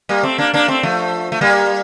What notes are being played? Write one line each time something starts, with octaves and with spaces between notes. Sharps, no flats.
G3 A#3
A3 C4
A#3 D4
A#3 D4
A3 C4
F3 A3
A3
G3 A#3